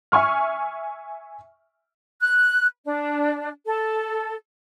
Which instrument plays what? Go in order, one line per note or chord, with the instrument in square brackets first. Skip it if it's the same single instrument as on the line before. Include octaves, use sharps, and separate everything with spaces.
[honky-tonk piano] E5 G#5 C#6 F6
[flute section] F#6
D4
A4